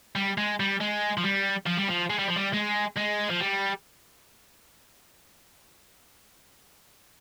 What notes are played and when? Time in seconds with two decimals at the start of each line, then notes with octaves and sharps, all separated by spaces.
0.16 G3
0.38 G#3
0.60 G3
0.81 G#3
1.17 F3
1.24 G3
1.67 F3
1.78 G3
1.89 F3
2.10 G#3
2.19 G3
2.28 F3
2.36 G3
2.54 G#3
2.97 G#3
3.30 F3
3.40 G3